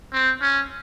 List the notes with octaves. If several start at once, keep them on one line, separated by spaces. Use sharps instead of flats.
C4
C#4